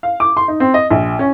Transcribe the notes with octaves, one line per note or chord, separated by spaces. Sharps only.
F5
D6
C6
D#4
C4
D#5
A#1
C#4